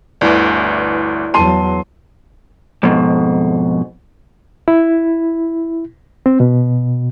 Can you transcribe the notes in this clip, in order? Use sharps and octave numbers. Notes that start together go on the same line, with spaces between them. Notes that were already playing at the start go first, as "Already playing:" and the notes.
G1 D2 E4 B4 D5
E2 F#3 A5 C6 D#7
F2 G#2 B2
E4
C4
B2